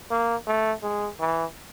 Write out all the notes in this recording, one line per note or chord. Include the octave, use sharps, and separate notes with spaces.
A#3
A3
G#3
E3